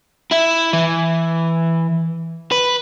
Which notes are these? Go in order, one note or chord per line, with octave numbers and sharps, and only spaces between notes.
E4 E5
E3
B4